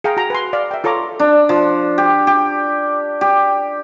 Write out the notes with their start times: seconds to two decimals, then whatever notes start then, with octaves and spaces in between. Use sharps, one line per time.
0.04 G#4 F5 G5 A#5
0.17 F#4 A#5
0.30 B4 G#5 C6
0.53 D5 F5
0.71 E5 G5
0.84 F4 A4 C#5 A#5 D6
1.19 D4
1.49 F3
1.98 G4
2.27 G4
3.21 G4